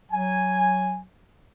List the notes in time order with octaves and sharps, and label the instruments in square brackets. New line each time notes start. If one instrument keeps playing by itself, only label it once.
[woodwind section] F#3 [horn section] G#5